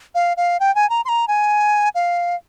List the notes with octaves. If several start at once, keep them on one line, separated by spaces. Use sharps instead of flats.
F5
F5
G5
G#5
A#5
C6
A#5
G#5
F5